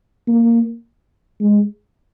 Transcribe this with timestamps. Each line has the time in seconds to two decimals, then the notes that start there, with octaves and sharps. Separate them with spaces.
0.28 A#3
1.40 G#3